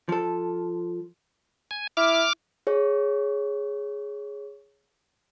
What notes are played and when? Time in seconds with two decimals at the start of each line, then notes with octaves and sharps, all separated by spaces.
0.09 F3 A4
1.71 G#5
1.97 E4 D6 F6
2.67 G#4 C#5